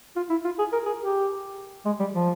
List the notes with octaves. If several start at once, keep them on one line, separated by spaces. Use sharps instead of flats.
F4
E4
F4
G#4
A#4
G#4
G4
G#3
G3
F3